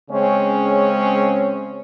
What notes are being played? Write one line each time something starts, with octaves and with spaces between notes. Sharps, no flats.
C#3 G#3 C4 C#4 C#5